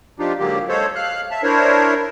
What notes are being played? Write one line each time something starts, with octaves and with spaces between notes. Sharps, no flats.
F3 D4 D#4 F4 G4
G#2 D3 F#3 A#3 G4
G#3 A4 C5 C#5
F5 F6 F#6
E5 A5
D4 E4 A#4 C5 C#5